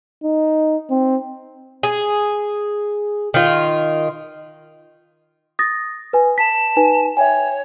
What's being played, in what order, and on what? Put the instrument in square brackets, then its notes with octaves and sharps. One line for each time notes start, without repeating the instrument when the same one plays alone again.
[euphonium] D#4
C4
[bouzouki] G#4
D#3 F4
[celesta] D#6 A6 A#6
B4 G#5
[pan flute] A5 [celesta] B6
[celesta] D#4 B4 G#5
[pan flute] C#5 [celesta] E5 G5 G#5